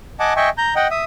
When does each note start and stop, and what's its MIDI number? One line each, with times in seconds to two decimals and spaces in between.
0.20 0.33 75
0.20 0.33 78
0.20 0.33 80
0.20 0.33 81
0.20 0.33 86
0.36 0.49 75
0.36 0.49 76
0.36 0.49 79
0.36 0.49 80
0.36 0.49 85
0.58 0.74 82
0.58 0.74 91
0.76 0.87 75
0.76 0.87 78
0.76 0.87 79
0.91 1.05 76
0.91 1.05 87